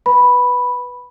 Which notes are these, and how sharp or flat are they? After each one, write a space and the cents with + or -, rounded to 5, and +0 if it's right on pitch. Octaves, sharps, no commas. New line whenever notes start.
B4 +0 B5 +0